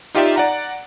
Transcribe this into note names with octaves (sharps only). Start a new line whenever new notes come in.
D#4 F4 G4 D5 E5
D5 F#5 A#5